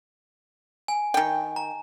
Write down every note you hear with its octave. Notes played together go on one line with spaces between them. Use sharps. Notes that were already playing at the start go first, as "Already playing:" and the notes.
G#5
D#3 G5
A#5